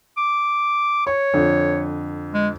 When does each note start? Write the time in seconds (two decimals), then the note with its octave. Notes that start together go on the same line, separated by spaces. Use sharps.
0.17 D6
1.07 C#5 C#6
1.34 F2 D3
2.34 G#3